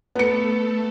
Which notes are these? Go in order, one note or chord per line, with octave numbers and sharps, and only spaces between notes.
A3 B3 A4 C#7